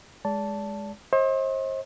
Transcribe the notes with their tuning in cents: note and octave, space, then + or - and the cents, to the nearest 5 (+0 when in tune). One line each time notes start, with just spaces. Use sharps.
G#3 +0 D5 -30 A5 +0
C5 +40 D#5 +35